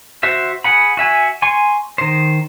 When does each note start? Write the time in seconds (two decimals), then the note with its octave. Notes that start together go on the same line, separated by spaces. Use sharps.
0.23 F#4 C5 E5
0.64 G#4 F#5 B5
0.97 F#4 E5 G#5
1.42 G#5 C6 C#6
1.98 D#3 C5